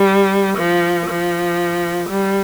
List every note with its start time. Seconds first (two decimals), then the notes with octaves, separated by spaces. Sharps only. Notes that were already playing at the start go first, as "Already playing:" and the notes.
Already playing: G3
0.58 F3
1.09 F3
2.09 G3